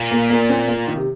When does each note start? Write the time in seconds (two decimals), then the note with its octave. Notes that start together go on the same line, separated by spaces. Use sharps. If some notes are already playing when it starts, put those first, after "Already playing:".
Already playing: A#2
0.11 A#3
0.30 A#3
0.49 C4
0.68 A#3
0.87 D#3
0.97 C3